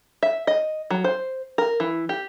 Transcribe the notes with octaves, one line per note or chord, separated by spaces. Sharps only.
E5
D#5
F#3
C5
A#4
E3
G4